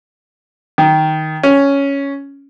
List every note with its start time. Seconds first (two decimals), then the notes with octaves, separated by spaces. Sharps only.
0.78 D#3
1.43 C#4